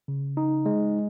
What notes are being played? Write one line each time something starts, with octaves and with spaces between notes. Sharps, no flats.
C#3
D#4
G#3